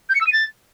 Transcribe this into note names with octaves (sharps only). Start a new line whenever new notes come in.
G6
C#7
E6
D#7
A6